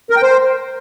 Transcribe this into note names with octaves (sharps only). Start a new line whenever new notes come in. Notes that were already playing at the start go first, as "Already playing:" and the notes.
A#4
G5
C5